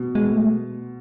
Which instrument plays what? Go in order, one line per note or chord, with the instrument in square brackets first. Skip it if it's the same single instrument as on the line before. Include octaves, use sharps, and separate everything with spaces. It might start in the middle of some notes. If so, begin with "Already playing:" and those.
Already playing: [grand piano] B2
[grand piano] B2 [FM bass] G#3
[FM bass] A3